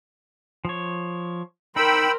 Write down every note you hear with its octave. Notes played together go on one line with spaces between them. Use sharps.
F3 C#5
D#4 A#4 C5 G5 B5 E6